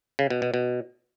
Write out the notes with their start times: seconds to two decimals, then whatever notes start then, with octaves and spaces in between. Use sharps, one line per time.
0.19 C#3
0.30 B2
0.42 B2
0.54 B2